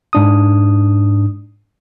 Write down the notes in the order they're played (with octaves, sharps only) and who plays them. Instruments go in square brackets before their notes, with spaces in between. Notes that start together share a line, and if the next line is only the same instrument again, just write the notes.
[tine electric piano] G#2 D4 D#6